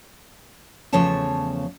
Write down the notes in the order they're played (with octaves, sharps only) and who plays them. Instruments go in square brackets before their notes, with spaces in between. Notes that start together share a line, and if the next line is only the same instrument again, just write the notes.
[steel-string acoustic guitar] E2 C#3 F3 A3 C#5 A5